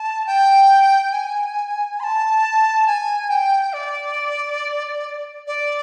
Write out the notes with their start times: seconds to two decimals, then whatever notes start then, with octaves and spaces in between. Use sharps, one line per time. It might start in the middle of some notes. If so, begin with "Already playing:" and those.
Already playing: A5
0.26 G5
1.13 G#5
2.00 C6
2.03 A5
2.86 G#5
3.29 G5
3.73 D5
5.47 D5